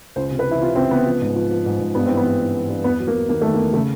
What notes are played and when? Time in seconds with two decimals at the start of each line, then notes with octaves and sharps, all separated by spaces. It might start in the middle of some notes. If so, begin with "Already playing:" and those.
0.16 C#2 C5
0.31 C3
0.39 B4
0.47 E3 E4
0.61 C3 F4
0.75 C#2 C4
0.91 C#2 B3
1.06 F3
1.21 G#2
1.35 F3
1.51 F3
1.66 G#2
1.80 G#2
1.95 G2 B3
2.06 E3 C4
2.17 B3
2.26 G2
2.40 E3
2.55 E3
2.69 G2
2.84 E2 B3
2.99 F#3
3.07 A#3
3.14 F#3
3.29 D#3 A#3
3.41 D#3 A3
3.54 A#3
3.59 E2
3.73 C#3 A3